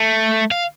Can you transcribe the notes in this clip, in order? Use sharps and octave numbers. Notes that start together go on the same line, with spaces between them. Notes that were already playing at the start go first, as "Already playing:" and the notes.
Already playing: A3
F5